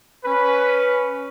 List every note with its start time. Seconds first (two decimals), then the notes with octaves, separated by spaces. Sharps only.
0.24 C#4 B4